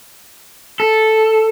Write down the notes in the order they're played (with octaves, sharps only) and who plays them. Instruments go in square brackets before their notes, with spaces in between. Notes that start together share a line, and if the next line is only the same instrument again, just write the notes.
[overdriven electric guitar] A4